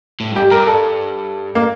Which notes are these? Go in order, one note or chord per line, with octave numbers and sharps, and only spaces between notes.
A2
G2 G4
G2 A#4
A4
A#3